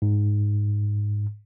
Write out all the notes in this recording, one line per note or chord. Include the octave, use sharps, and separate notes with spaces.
G#2